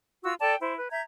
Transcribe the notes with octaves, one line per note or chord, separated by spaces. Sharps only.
F4 F#4 E6
A4 D5 G5 A5
E4 C5
B4
E5 A#5 G6 G#6